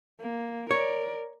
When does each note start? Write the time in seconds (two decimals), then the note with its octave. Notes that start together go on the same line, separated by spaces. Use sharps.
0.20 A#3
0.71 A#4 C#5 D5